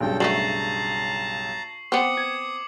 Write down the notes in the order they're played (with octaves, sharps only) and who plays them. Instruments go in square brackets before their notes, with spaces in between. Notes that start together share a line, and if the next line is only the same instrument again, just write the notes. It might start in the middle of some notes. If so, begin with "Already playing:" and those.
[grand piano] B1 G2 C#3 [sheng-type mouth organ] A4 G5
[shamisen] F#3 G3 A3 [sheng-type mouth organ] A5 A#5 [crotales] C#6 C7 F#7
[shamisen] B3 C4 [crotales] D6 C#7 F#7 [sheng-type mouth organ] D#6
[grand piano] G#6